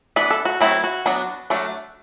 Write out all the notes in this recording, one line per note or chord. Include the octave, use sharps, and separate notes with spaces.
E3 B3 D4 B4
A4
F#4
F#3 A3 C4 E4
F#4
F#3 B3 D4
F#3 A3 D4